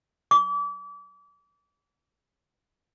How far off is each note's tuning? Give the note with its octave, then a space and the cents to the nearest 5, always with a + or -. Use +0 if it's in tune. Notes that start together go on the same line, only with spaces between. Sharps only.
D6 -35